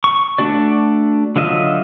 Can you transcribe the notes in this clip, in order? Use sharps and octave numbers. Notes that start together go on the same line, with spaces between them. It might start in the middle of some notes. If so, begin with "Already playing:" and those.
C#6
A3 D4 F#4 D5
D3 F#3 F4 D#5 E5